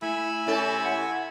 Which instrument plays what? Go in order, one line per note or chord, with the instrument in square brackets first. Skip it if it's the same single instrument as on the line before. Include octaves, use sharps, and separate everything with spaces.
[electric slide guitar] A3 [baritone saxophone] E4 [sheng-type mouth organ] G#5 B5 E6
[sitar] C3 C#4 A4 [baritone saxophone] E4
[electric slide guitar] F#5